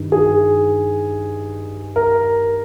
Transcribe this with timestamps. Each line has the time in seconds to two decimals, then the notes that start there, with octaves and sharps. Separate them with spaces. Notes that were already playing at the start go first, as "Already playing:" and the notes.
Already playing: G2 D#3
0.12 G#4
1.96 A#4